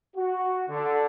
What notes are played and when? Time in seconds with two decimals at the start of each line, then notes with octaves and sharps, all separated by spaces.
0.16 F#4
0.68 D3